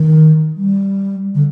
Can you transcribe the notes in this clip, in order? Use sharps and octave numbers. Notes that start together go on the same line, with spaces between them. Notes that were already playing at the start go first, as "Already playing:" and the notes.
Already playing: D#3
G3
D3